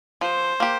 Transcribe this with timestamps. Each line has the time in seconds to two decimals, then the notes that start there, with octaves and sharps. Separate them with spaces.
0.21 F3 C5
0.60 A#3 G4